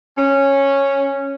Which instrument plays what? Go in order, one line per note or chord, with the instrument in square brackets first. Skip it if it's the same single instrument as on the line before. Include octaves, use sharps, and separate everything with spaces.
[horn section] C#4